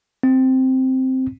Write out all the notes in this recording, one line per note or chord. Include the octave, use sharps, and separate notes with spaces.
C4